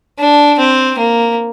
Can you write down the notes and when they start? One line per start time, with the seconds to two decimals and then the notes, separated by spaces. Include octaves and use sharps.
0.19 D4
0.59 C4
0.99 A#3